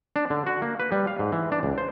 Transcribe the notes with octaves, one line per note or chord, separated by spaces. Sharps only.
D4
D3
F#4
A#3
B4
G3
F5
G#2
E3
D4
C#2
C5